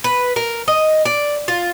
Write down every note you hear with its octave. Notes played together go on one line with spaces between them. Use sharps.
B4
A#4
D#5
D5
F4